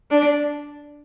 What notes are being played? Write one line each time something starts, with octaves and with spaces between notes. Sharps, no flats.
D4